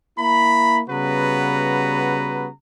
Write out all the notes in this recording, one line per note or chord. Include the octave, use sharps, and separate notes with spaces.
A#3 E4 A#5 B5
C#3 G3 B3 F#4 B4 A#5